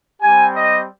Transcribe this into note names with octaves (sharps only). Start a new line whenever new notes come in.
G3 C4 G4 G#5
D#5